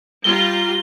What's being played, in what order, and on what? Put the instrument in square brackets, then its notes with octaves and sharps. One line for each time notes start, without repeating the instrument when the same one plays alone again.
[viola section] G3 F4 A#5 [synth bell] G7